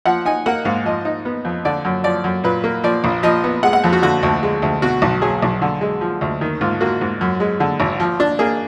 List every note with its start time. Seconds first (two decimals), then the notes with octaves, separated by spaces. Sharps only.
0.06 F3 F#5
0.25 D#4 G#5
0.46 A#3 F#5
0.65 G#2 F5
0.85 F3 D#5
1.05 D#4
1.25 B3
1.45 F2
1.65 D3 D5
1.85 F#2
2.04 F3 D5
2.24 F#2
2.44 A#2 B4
2.64 A#3
2.84 F3 D5
3.04 A#1
3.23 F3 D#5
3.44 B3
3.63 G#3 F#5
3.73 F#5
3.84 F2
3.93 F#4
4.03 D3 F#4
4.23 D2
4.43 G#3
4.62 D2
4.82 B2 F#4
5.02 B1
5.22 F#3 G#4
5.42 B1
5.62 D3
5.81 G#3
6.01 F3
6.21 D2
6.41 D#3
6.61 G#2 F4
6.81 A#3 F#4
7.01 G#2
7.21 F#2
7.40 G#3
7.60 D3
7.80 G#1
8.00 F3
8.20 D4
8.39 A#3 G#4